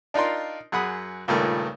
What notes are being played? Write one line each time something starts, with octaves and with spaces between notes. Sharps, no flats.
D4 D#4 F4 A#4 C6
F#2 G#4 F#5 B5 D#6
C#2 G2 A#2 D#3 A3